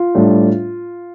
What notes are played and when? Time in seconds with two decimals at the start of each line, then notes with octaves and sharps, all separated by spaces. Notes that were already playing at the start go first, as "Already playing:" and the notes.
Already playing: F4
0.15 A2 G3 D4